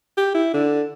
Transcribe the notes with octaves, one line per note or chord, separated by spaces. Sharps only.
G4
E4
D3